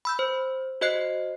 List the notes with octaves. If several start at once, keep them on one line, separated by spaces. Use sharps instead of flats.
B5 E6 G6
C5
F#4 C5 D#5 F#6 C7